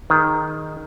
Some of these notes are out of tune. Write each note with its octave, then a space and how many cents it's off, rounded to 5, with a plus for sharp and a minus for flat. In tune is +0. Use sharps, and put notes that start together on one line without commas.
D#3 +0 G#4 +0